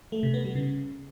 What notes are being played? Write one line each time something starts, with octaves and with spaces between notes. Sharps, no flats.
A3
C3
B3
G3
C#3